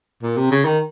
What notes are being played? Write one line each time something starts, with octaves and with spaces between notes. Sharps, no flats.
A#2
C3
C#3
D#3